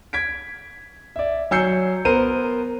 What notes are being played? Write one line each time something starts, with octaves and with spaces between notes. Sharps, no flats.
G#6 B6 D7
D5 E5
F#3 G#5 E6 G6 C7 C#7
B3 A#4 C5 D#7